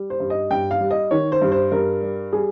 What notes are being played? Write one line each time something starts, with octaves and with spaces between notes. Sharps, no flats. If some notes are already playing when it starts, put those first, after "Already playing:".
Already playing: G3
C5
G2
D#5
G2 G5
F5
G3
D#5
D#3 C#5
C5
G2
C5
G2 A#4
G3
G3 G#4